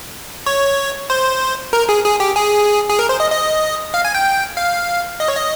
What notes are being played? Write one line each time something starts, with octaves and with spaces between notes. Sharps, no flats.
C#5
C5
A#4
G#4
G#4
G4
G#4
G#4
A#4
C5
D#5
D#5
F5
G#5
G5
F5
D#5
C#5
D#5